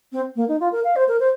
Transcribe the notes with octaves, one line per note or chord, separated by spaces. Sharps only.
C4
A#3
D#4
F4
A#4
F5
C5
A#4
C5